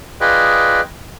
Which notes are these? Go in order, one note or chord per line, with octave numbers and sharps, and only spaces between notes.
F4 G#4 B4 D5 D#5 G5